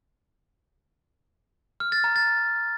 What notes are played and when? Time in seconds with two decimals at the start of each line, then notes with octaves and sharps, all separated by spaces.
1.80 F6
1.92 A6
2.04 A#5
2.16 A6